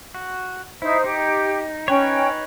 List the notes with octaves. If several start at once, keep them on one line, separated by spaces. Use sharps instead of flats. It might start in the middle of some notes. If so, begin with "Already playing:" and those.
F#4
D#4 E4 C5
D#4 G4
C#4 D#4 B4 C#5 G5